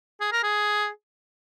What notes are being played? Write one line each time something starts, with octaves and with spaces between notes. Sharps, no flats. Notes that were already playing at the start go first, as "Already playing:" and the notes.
G#4
A#4
G#4